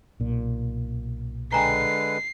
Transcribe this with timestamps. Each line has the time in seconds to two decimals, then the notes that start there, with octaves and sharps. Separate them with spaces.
0.20 B1 A#2
1.52 D3 G#3 B4 G5 G#5 A#5 C7